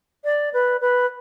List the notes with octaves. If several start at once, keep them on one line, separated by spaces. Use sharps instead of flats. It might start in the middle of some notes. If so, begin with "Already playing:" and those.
D5
B4
B4